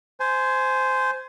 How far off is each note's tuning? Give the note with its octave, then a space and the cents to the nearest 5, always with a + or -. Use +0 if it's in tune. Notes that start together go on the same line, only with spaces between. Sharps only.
C5 -10 G#5 +20